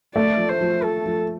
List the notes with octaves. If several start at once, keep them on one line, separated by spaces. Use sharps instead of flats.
A3 D5
F3
C5
F3
F3 A4
F3